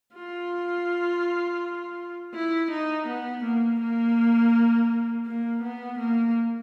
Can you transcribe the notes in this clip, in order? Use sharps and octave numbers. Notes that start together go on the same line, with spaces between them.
F4
E4
D#4
B3
A#3
A#3
A#3
B3
A#3